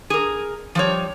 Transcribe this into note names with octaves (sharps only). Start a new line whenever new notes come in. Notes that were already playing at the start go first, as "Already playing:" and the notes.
G#4 A#4
F3 G3 C#5